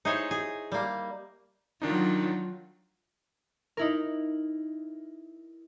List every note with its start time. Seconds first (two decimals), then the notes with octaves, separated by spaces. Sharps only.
0.05 D#4 E4 G#4 C5 C#5
0.31 G#4
0.72 G3 A#3
1.82 D#3 F#3 D4 D#4 F4
3.77 D#4 E4 A#4